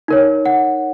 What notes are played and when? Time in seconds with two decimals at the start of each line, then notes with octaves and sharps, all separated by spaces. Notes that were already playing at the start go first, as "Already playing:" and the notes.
0.08 D#4 A#4 C#5
0.46 F#5